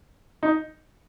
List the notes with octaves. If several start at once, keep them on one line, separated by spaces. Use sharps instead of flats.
D#4